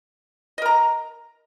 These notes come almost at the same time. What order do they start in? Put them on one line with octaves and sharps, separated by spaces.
D#5 A#4 A#5